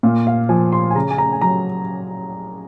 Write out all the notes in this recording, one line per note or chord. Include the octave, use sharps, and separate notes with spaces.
A#2 F5
F5
F3 G#5
C6
G#5
C#3 A#5
G#5
A#5
G#5
F#3 A#5